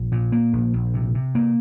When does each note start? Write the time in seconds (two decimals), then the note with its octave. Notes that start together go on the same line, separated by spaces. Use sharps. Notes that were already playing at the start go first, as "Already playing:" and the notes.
Already playing: A#1
0.12 A#2
0.32 A#3
0.53 A#1
0.73 A#1
0.94 C3
1.15 C3
1.35 A#3